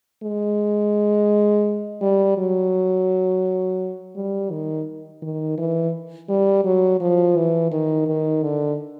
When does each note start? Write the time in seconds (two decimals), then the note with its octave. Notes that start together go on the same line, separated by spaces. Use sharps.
0.23 G#3
2.02 G3
2.37 F#3
4.16 G3
4.51 D#3
5.22 D#3
5.58 E3
6.29 G3
6.65 F#3
7.00 F3
7.36 E3
7.71 D#3
8.07 D#3
8.43 D3